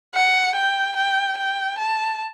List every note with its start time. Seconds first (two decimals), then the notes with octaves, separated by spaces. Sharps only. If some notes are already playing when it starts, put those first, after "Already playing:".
0.14 F#5
0.56 G5
0.96 G5
1.38 G5
1.78 A5